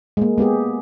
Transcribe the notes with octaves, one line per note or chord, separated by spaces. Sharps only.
G#3 A#3
G#3 B3 G4 G#4